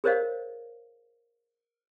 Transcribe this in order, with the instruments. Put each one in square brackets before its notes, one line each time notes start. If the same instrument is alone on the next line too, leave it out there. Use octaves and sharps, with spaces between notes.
[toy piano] G#4 A#4 C5 C#5 D#5 F5